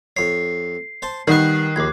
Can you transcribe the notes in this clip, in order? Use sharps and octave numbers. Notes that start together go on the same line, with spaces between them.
F2 C#5 C7
C5 A5 C6
D#3 G3 B3 C#6 F#6 C7
A#1 D#2 D6 G#6